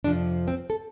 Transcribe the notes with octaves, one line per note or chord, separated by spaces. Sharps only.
F2 C3 F3 D4
C4
A4